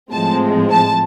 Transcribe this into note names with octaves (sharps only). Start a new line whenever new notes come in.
A2 F3 G#3 C4 A5
A5